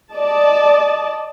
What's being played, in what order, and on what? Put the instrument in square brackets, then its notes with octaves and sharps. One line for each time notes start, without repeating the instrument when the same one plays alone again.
[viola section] D5 D#5 A5